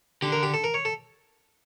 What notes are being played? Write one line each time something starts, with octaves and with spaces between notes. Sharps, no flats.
D3 G4
A#4
G4
A4
A#4
C#5
A4